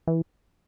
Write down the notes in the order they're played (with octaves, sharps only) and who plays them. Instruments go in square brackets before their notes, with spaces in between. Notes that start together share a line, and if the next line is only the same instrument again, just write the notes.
[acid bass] E3